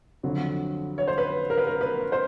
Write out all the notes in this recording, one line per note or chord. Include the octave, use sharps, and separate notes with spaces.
F2 D3 F#3
C#5
C5
B4
A#4
B4
A#4
B4
C5